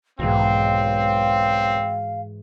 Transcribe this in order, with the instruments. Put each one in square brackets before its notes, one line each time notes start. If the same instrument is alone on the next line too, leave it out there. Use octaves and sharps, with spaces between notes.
[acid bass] B1 [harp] G#2 E3 F#4 [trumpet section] C4 [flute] F5